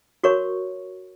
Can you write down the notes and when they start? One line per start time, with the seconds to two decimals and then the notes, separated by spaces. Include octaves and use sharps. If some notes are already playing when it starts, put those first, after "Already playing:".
0.24 F#4 A#4 C#5 C#6